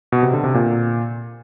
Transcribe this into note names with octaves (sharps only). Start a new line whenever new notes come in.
B2
C3
D3
C3
A#2